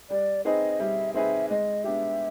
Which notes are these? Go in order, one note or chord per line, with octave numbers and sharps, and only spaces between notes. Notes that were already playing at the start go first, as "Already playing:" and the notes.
G3 D5
C4 D#4 G#4 B4 D#5
G3 E5
C4 D#4 G#4 B4 E5
G#3 D#5
B3 D4 G4 E5